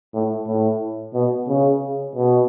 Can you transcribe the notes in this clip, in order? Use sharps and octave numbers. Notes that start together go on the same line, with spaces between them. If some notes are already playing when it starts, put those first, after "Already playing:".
A2
A2
B2
C#3
B2